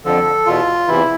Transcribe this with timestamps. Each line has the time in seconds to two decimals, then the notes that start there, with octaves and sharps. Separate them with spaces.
0.05 F2 D3 F3 A4
0.46 E2 B2 F4
0.88 E2 C3 E3 E4